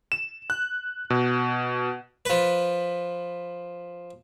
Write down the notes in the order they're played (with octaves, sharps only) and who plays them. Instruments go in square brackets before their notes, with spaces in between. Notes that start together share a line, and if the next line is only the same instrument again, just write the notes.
[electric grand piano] E7
F#6
B2
[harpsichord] F3 B4